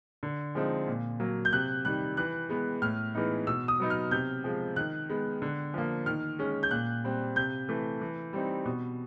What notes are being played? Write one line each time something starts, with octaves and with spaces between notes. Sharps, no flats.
D3
F3 G#3 C4 D#4
A#2
F#3 A#3
G6
C3 F#6
D#3 G3 F#6
E3 F#6
G#3 B3
A2 F6
E3 G#3 B3 D#4
B2 E6
D#6
F#3 B3 D#4
F6
C3 G6
F3 G#3
D#3 F#6
G#3 B3
D3
F3 A#3
D#3 F6
G#3 C#4
G6
A#2 F#6
G3 C4
C3 G6
E3 A3
E3
G3 C4 D#4
B2